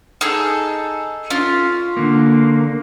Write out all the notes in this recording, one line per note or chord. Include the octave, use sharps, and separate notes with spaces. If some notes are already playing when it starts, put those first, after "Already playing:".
D#4 G#4 A4
C#4 F4
D3 A#3